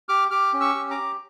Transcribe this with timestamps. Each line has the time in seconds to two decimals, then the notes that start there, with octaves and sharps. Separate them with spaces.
0.09 G4 D6 F6
0.31 G4 D6 F6
0.53 C#4
0.60 C#6 E6
0.75 G4
0.91 A#5 D6
0.97 G4